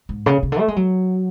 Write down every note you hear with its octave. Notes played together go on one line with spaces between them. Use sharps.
G#2
C#3
C#3
D3
A3
G#3
F#3